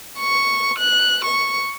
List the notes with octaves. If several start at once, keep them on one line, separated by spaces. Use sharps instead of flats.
C#6
F#6
C#6